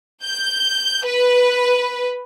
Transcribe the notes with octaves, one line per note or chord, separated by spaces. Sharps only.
G6
B4